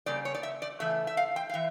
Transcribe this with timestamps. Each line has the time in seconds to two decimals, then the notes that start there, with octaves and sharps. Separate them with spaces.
0.06 C#3 G3 A#3 D5
0.25 C#5
0.34 D5
0.43 E5
0.62 D5
0.80 C#3 E3 A3 E5
1.07 E5
1.17 F5
1.36 G5
1.49 F5
1.54 E3 E5